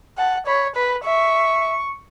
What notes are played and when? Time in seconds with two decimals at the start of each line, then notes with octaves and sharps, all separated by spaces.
0.18 F#5 A5
0.47 C#5 B5
0.75 B4 B5
1.05 E5 C#6